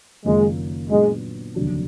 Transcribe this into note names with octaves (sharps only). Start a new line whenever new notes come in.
F#1 F#2 D#3 G#3 A#3 F4
A#2 F#3 G#3 B3 D4
F1 D#2 D3 F#3 D4